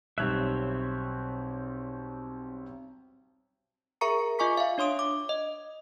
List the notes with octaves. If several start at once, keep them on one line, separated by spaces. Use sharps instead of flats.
B1 G3 C4 C#5 E5 F#6
G#4 A#4 E5 A#5 C#6 C#7
F4 D#5 G#5 C#6 D6 B6
E5 F5
D4 C#5 C6 D#6 D7
D6
D#5